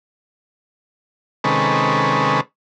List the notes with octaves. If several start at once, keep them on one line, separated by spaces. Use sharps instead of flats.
C3 D#3 G#3 C#4 A4 B4